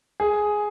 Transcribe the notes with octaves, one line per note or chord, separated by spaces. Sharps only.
G#4